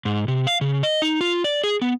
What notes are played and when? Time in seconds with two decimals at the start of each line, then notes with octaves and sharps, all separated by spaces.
0.05 G#2
0.28 C3
0.47 F5
0.61 C#3
0.83 D#5
1.02 D#4
1.21 F4
1.44 D5
1.64 G#4
1.82 B3